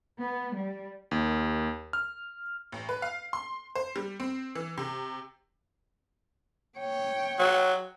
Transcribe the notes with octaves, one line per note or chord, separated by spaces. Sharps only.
B3
G3
D#2
F6
A1
B4
F5
C6
C5
G3
C4
E3
C3
C#5 G5
F#3